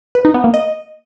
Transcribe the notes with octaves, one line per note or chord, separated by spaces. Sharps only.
B4
D#4
B3
A#3
D#5